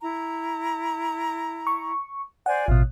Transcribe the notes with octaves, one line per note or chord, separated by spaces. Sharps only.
E4 A#5
C#6
C5 D5 F#5 G#5
A1 B2 F4